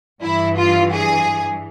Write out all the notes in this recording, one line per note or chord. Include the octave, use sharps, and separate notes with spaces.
G2 E3 E4
F4
G#4